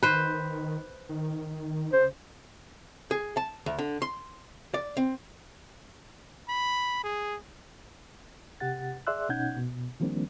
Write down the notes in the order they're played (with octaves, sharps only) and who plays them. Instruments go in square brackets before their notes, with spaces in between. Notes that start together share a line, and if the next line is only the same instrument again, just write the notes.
[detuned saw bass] D#3 [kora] B4 C5
[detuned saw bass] D#3
[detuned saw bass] C#3 [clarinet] C5
[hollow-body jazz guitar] G#4
A5
D2
D3
C6
D5
C4
[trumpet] B5
G#4
[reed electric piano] C3 G4 F#5 A6
G#4 D5 E5 C6 E6 F#6
B2 C#4 D#4 F#5 G6 G#6
B2
D#3 F3 G3 A#3 C4 D4